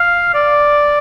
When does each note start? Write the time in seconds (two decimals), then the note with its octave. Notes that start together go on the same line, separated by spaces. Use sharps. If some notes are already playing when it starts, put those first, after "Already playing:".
Already playing: F5
0.34 D5